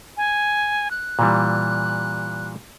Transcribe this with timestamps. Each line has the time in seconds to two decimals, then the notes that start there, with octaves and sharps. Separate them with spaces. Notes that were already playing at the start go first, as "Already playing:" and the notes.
0.17 G#5
0.91 F#6
1.19 A#2 E3 G3